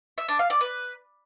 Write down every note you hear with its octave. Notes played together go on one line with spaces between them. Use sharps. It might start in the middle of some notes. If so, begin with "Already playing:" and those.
E5
D4
F5
D5
B4